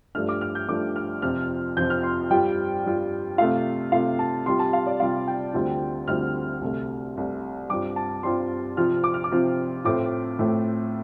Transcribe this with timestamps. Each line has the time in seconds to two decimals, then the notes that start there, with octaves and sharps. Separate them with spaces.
0.15 G2 F3 A3 D4 F6
0.29 D6
0.41 F6
0.55 G6
0.68 G2 F3 A3 D4 D6
0.96 F6
1.22 F2 C3 F3 F6
1.76 F2 C3 F3 G6
1.90 F6
2.03 C6
2.30 G2 G3 F4 G5
2.84 G2 G3 F4
3.38 C3 A3 F4 F5
3.92 C3 A3 F4 F5
4.19 A5
4.46 C3 G3 F4 C6
4.60 A5
4.73 F5
4.87 D5
5.00 C3 G3 F4 F5
5.27 G5
5.54 D2 D3 G3 C4 F4
6.08 D2 D3 G3 C4 F4 F6
6.61 C2 C3 A3
7.16 C2 C3 A3
7.70 G2 G3 C4 F4 D6
7.96 A5
8.23 G2 G3 C4 F4 C6
8.77 C3 F3 C4 F4 F6
9.04 D6
9.14 F6
9.24 D6
9.31 C3 F3 C4 F4
9.85 A2 A3 C4 F4 D6
10.39 A2 A3 C4 F4